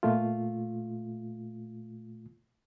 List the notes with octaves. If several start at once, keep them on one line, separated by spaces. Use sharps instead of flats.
A#2 A3 F4